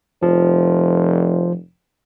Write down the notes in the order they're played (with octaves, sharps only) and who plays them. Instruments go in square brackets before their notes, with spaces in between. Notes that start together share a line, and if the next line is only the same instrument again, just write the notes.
[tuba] F1 [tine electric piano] F3